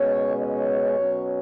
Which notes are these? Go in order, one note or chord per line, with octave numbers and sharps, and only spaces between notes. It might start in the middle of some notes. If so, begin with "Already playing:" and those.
Already playing: B2 G#3 C#4 C#5
C#5
B2 F#3 C#4